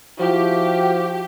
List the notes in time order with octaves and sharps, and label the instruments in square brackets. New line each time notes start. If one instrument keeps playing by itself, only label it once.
[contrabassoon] F3 [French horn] E4 [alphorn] F#4 [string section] G4